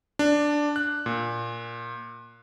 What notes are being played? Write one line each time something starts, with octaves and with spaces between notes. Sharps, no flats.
D4
F#6
A#2